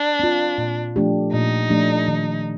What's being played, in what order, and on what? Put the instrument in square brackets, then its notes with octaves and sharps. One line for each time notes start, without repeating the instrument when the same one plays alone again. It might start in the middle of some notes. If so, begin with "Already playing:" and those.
Already playing: [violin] D4
[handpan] C4 F4
A#2
F3 A3 D4 G4
[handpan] A#2 [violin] D#4
[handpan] F3 A3 D4 G4
D#3